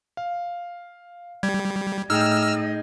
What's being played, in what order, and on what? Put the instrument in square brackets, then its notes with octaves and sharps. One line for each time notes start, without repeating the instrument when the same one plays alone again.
[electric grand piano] F5
[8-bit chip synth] G3 [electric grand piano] G#6
[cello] A2 D#5 [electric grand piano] D#4 G#4 G5 [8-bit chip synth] E6 F6